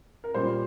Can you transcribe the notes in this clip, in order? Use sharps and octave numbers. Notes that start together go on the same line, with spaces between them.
A#4
A#2 G3 A#3 C5